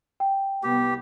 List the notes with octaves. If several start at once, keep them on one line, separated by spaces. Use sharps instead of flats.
G5
C2 B3 G4